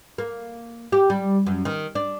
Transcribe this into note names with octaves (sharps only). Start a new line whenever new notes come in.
A#3
G4
G3
F#2
D#3
D4